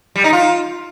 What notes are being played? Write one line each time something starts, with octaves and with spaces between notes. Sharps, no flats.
G3
D#4
F4